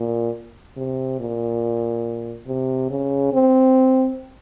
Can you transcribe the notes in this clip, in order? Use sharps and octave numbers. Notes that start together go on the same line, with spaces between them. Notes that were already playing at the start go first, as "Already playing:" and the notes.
Already playing: A#2
C3
A#2
C3
C#3
C4